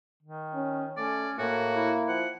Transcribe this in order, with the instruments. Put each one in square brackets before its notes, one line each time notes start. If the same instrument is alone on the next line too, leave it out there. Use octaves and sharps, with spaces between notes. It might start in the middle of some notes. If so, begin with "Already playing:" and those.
[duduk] D#3
[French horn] C#4
[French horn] A3 [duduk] C#4 [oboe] D5
[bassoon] A2 [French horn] A#3 [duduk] E4 [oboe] F#4
[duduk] E4
[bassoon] F3 [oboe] F#5